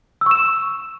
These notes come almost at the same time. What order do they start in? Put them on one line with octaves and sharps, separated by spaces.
E6 C#6 E7